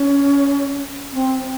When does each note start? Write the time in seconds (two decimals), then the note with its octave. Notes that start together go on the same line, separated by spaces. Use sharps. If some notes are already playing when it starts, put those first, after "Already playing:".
Already playing: C#4
1.13 C4